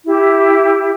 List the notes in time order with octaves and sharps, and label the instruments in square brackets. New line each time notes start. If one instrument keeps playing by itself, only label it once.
[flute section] E4 G4